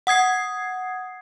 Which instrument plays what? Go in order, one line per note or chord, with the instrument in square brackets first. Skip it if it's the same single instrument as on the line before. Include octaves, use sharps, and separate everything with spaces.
[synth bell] F#5 D#6 G#6 C7